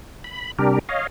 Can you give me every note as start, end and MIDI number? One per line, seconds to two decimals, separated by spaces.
0.24 0.52 83
0.59 0.79 48
0.59 0.79 55
0.59 0.79 62
0.59 0.79 67
0.59 0.79 70
0.89 1.07 73
0.89 1.07 75
0.89 1.07 77